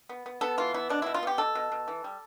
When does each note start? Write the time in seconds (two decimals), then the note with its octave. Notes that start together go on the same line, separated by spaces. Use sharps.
0.09 B3
0.26 B3
0.41 B3 A4
0.58 E3 F4
0.74 B3 E4
0.89 B2 D4
1.02 B2 E4
1.14 F4
1.23 B3 G4
1.38 B2 A4
1.55 B2
1.72 B2
1.88 E3
2.04 G3